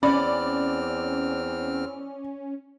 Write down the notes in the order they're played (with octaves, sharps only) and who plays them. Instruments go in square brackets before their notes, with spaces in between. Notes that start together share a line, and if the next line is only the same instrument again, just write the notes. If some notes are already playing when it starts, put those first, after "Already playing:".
[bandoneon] E2 C4 F6 [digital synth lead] C#4 [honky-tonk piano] D5 [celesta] B5